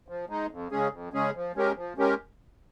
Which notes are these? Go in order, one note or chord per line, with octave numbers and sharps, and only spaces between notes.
F3
G#3 D#4
F2
C#3 G#3 C#4 G#4
F2
C#3 G#3 C#4 G#4
F3
G#3 C#4 G4 A#4
F3
G#3 C#4 G4 A#4